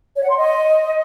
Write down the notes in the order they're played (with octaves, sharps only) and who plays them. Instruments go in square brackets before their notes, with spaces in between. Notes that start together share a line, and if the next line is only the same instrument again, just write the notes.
[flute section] C#5
F#5
C6
D#5